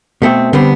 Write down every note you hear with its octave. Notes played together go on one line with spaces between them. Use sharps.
B2 A3 C4
D3 G3 B3 C4